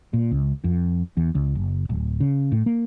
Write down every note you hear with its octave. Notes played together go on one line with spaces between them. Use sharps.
A#2
C#2
F2
E2
C#2
F#1
D1
C#3
A2
A#3